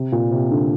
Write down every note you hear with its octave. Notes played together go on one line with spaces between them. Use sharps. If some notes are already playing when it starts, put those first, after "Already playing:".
Already playing: C3
A#2
C3
D3